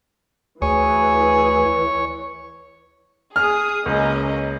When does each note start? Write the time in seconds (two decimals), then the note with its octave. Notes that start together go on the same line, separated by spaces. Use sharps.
0.62 D2 E3 G#4 C#5
3.36 G#4 D#6 F6
3.86 C#2 A#3 C#4 D#5